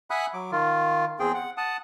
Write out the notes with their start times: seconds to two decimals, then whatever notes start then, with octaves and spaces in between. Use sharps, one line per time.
0.10 E5 F#5 G#5 B5 D#6 F#6
0.34 F#3 D6
0.52 D#3 F4
1.20 E2 C4 G#4 G5
1.34 F#5
1.57 F#5 A5 D#6